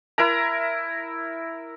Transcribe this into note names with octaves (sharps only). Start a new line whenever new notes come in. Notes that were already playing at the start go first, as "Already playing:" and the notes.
E4 A#4 A#5